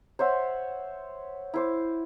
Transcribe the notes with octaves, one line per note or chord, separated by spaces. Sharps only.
C5 C#5 E5 F#5
E4 C5 D6